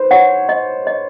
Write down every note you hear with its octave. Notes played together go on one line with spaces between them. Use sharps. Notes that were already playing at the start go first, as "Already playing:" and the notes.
Already playing: B4 C5
C#5 F#5
D#5
D#5